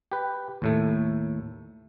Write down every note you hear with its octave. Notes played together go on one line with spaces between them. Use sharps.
G4 B4
D#2 A2 A3